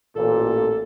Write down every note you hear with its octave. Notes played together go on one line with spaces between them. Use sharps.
A1 A#2 A4